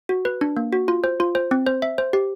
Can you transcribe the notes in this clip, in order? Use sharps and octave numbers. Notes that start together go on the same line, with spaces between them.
F#4
B4
D4
A#3
F#4
F4
C5
F4
C5
C4
C5
E5
C5
G4